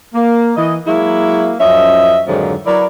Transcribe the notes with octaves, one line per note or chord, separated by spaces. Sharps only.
A#3
E3 D#5
F#3 G#3 A#3 E4
F#2 F3 C#4 D#5 E5
F2 G#2 D3 D#3 F3 F#3
F#3 E4 A#4 B4 D5